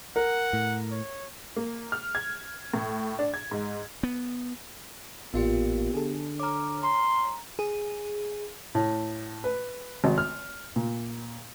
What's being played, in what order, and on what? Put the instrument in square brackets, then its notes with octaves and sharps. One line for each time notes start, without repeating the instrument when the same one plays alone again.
[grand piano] A#4 [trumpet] F#5
[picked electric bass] A2
[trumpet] C#5
[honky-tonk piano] A#3
F6
G#6
A2
D4
G#6
G#2
[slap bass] B3
[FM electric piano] A1 F4 [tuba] A#2 [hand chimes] B3 G4
[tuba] D3 [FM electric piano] G#4 A4
[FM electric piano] C#5 F6 [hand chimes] A#5 D6
[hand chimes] A#5 [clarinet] C6
[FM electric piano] G#4
[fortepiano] A2
B4
G#1
F6
A#2